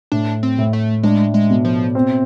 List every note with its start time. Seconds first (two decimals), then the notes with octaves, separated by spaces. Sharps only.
0.12 A2 D4
0.43 C4
0.58 A2
0.73 A3
1.03 G#3 D4
1.34 G#3
1.50 B2
1.65 F3
1.95 C4